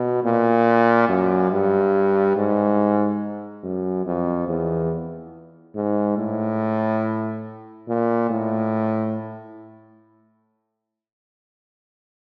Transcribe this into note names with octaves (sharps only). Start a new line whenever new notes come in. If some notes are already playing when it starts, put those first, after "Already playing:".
Already playing: B2
A#2
F#2
G2
G#2
F#2
F2
E2
G#2
A2
A#2
A2